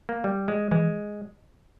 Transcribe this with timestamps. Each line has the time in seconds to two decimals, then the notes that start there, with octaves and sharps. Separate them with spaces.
0.09 A#3
0.24 G3
0.48 G#3
0.71 E3 G#3